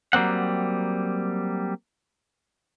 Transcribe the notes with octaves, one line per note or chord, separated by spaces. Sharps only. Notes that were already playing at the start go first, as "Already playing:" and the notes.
F#3 G3 A#3 C4 F#5